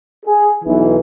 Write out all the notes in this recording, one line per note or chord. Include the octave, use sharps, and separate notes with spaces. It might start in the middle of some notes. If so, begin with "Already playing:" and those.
G#4
B1 E3